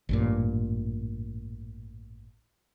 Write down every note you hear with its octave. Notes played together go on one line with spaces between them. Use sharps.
A1 G2 A#2